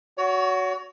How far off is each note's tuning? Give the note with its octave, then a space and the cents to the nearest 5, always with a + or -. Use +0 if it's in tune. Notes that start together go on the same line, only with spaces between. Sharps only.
F#4 +0 C#5 +35